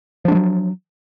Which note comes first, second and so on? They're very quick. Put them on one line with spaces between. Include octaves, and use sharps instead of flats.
F3 D4 G#3 F#3